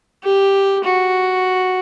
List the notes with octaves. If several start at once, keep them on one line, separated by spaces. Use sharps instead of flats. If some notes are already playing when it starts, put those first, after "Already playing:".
G4
F#4